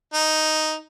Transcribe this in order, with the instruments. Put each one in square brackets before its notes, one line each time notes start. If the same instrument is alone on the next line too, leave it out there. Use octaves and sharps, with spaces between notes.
[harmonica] D#4